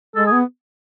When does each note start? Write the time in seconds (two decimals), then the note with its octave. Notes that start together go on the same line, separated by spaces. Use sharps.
0.16 G#3 A4
0.26 G#4
0.32 B3